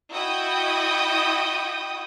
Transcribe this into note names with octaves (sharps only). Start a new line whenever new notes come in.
E4 F#4 D#5 G5 D#6